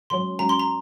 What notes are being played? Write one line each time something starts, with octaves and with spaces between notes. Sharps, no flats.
G#2 F#3 C#4 C6
G#2 F#3 C#4 A#5
C6
A#5